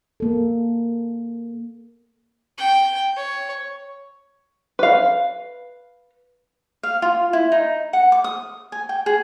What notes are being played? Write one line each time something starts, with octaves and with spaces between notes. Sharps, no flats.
A#3 A4
G5
C#5
B4 F5
F5
F4
E4
D#4
F#5
D6
D#6
G#5
G5
G#4